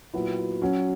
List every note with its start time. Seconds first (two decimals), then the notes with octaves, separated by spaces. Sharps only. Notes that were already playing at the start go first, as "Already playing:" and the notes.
0.13 A#2 F#3 B3 E4
0.62 F#3 C#4 F#4